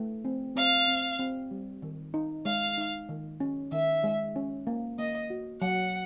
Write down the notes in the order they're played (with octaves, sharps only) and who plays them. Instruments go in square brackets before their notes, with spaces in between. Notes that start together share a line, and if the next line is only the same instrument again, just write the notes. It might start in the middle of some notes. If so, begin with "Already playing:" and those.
Already playing: [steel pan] A3
C4
[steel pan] C4 [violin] F5
[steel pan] C4
C4
G3
D#3
D#4
[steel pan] G#3 [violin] F5
[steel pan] D#4
D#3
C#4
[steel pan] D#3 [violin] E5
[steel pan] G#3
C#4
A#3
[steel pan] A#3 [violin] D#5
[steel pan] F#4
[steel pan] F#3 [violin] F#5